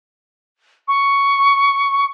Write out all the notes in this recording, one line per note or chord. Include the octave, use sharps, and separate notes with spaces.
C#6